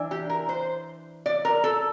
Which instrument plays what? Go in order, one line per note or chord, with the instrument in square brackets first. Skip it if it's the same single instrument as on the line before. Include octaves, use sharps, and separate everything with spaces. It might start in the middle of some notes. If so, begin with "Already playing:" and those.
Already playing: [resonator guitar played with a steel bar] E3 D4
G4
A#4
C5
D5
A#4
A4